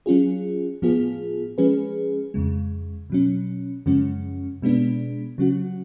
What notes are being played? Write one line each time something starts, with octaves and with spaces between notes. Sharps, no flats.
F#3 C#4 F4 G#4
A2 F3 B3 F4 G#4
F3 G#3 C#4 G#4 B4
F2 C#3 G#3
B2 F#3 C#4
F#2 C#3 F3 G#3 C#4
B2 G#3 B3 D4
C#3 F#3 C#4 F#4